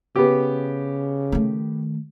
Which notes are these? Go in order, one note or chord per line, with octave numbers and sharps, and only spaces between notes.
C#3 B3 G4
D#3 A3